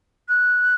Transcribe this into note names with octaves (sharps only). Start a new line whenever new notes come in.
F#6